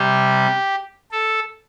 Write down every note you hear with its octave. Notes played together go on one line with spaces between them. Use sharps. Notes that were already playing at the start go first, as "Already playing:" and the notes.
Already playing: C3 G3 G4
A4